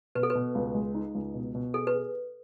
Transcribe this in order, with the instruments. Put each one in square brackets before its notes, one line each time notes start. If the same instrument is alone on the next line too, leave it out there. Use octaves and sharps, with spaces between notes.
[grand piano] B2 [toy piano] B4
[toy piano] A4
B4
[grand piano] B2
C#2
G#3
D#4
C#2
B2
B2
[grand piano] G#4 [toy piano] A4
[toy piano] B4
[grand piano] G#4